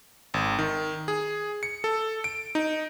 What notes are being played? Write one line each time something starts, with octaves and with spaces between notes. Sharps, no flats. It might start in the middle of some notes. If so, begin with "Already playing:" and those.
G#1
D#3
G#4
C#7
A4
D7
D#4